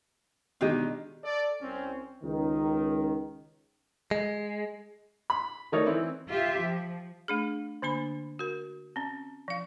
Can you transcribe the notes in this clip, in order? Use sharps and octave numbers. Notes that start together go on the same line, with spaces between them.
B2 D#3 G#3 D4 G4 D#5
A4 D5
C2 C4 C#4
C#2 D#3
G#3
B5 C6
D#3 A3 D#4 A#4 C#5 D5
E3 C4 E4
F4 G4 E5
F3
A3 D4 G#4
D3 A#3 D4 B5
F#4 A#4
C4 C#4
F3 F5